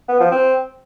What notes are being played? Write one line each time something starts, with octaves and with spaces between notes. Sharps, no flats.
B3
F3
C4